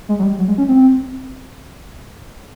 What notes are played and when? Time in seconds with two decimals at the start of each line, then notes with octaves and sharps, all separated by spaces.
0.09 G#3
0.19 F#3
0.23 G3
0.39 F#3
0.48 G#3
0.58 C#4
0.68 C4